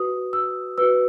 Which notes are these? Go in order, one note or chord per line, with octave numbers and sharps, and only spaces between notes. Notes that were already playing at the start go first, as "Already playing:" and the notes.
Already playing: F#4 B4 D#6
E6
F#4 B4 E6